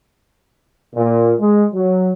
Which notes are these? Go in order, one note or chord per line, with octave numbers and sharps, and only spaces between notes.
A#2
G#3
F#3